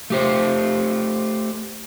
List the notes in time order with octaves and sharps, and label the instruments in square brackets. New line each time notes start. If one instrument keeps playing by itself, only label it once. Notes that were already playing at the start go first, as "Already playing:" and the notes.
[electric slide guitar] A3 G4 C5